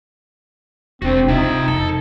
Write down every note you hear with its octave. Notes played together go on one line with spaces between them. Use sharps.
E1 C4 D4 F#4
C3 D#4 F4 E5
F2 C3 A4 A5